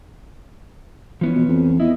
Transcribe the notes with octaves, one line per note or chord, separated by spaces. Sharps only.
E3 F3 B3 C#4
B2
F2
E2 E4 D#5